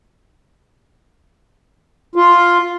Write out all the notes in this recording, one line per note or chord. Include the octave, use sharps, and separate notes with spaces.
F4